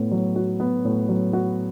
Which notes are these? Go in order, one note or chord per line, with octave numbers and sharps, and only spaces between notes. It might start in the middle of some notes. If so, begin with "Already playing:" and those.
Already playing: A2 B3
F#3
F#4
B3
A2
F#3
F#4